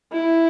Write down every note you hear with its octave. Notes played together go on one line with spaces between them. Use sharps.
E4